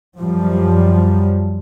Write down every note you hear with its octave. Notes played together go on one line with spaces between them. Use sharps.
F#2 F3 G3